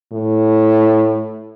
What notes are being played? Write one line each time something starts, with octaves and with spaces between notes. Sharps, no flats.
A2